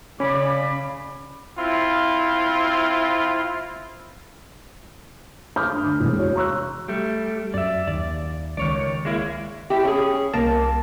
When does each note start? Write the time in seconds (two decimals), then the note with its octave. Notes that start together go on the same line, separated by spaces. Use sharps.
0.20 C#3 C#4 D5 B5 D6
1.58 C4 E4 F4
5.56 B5 D6 D#6 F6 G6
5.71 G2
5.84 D2
6.00 E1 C2
6.17 F#4 C#5
6.36 A#5 C#6 E6 F#6
6.88 G3 A3
7.54 F#2 D5 E5
7.88 D#2 D5
8.57 C#2 D#3 C#5 D5
9.05 G#3 A#3 E4
9.70 E4 G4
9.85 C#4 G#4
10.34 C2 A#3 A5